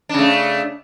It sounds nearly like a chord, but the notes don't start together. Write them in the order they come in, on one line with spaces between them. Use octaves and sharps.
D4 C#3 A3